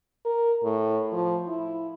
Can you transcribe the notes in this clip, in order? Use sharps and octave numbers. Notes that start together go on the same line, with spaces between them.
A#4
A2
F3
E4